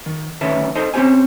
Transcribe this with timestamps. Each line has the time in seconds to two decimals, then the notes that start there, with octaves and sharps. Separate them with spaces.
0.06 D#3
0.41 D2 D#3 C#4 B4 E5 A5
0.75 D#4 A4 C5 D#5 A5
0.94 C4 C#4 F4 G4 C5 G#5